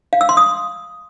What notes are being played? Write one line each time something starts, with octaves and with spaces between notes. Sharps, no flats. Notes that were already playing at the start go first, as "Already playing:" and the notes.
F5
E6
C6
D#6